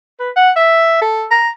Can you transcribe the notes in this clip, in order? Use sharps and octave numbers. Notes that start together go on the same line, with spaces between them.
B4
F#5
E5
A4
A#5